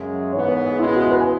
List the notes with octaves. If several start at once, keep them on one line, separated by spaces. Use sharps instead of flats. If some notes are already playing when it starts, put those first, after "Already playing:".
Already playing: F#2 C#3 G#3 E5
G#2 E3 B3 C#5
B4
G#4
C#2 B2 G#3 B3 E4
G#4
F#4
B4
G#5